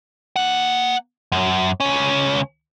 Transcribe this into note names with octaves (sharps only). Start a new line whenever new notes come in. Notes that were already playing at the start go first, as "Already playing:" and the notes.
A#3 F#5
F#2
C#2 C#4